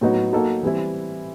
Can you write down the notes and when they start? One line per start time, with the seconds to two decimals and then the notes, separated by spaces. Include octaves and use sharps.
0.01 A2 F#3 B3 D#4 F#4
0.33 F#3 A#3 D#4 F#4 A4
0.63 E3 G3 C4 E4